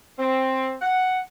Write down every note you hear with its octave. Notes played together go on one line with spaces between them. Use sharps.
C4
F#5